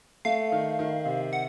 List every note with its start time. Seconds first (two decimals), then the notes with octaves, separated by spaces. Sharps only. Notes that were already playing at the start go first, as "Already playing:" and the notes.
0.25 A3 F5
0.52 D#3
0.79 D#3
1.05 C3
1.33 F#5